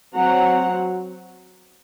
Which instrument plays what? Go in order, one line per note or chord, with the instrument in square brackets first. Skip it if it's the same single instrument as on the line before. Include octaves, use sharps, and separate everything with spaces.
[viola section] F#3 C4 F#5 A#5